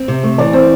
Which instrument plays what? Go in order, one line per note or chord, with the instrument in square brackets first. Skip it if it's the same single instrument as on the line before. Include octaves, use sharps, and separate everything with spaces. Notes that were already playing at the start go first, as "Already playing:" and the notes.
Already playing: [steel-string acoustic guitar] C4
C3
A3
[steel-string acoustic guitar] E3 [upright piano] D5
[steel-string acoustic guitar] C4 [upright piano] C5